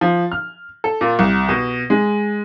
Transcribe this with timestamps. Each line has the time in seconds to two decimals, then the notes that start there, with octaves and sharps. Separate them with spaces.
0.01 F3
0.32 F6
0.84 A4
1.01 A#2
1.19 C2
1.49 B2
1.90 G#3